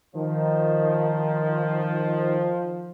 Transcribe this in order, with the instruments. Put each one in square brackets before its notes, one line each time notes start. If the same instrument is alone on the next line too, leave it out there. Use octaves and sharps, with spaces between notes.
[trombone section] D#3 [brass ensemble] F3